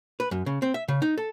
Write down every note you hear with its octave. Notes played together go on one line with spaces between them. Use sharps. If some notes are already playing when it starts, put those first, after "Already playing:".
B4
F#2
C#3
C4
E5
C#3
D#4
A4